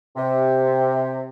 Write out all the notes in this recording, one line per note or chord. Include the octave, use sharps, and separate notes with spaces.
C3